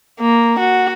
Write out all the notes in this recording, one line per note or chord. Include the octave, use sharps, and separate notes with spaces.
A#3
F#4